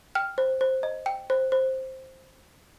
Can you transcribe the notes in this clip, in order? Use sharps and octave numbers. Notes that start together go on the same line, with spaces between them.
G5 F6
C5
C5
D#5
G5
C5
C5